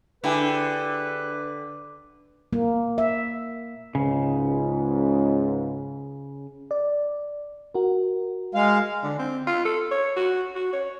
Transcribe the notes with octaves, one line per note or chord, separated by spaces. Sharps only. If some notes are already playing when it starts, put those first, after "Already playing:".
D3 E4 G4 G#4 B4
A#3
E5
C#2 G#2 C#3
D5
F#4 A#4
G#3 F5
D3
C4
F4
A4
C#5
F#4
F#4
C#5